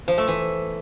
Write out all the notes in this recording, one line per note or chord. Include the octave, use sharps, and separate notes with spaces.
F3
A3
E3